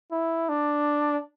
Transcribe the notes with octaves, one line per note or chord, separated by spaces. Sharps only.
E4
D4